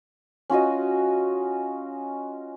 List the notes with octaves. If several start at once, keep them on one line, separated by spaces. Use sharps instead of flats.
C#4 F4 F#4 D#5